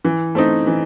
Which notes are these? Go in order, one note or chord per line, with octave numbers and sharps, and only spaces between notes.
E3
A3 C4 D#4
E3